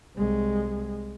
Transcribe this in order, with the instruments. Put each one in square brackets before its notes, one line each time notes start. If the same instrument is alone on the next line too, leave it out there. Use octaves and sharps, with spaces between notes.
[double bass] C2 G#3